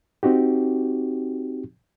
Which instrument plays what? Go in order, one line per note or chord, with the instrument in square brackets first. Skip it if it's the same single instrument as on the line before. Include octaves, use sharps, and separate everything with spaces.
[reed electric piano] C4 D#4 F#4 G4